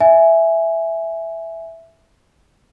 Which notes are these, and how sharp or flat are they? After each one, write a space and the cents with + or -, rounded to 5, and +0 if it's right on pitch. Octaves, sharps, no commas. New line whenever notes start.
E5 +0 G#5 +0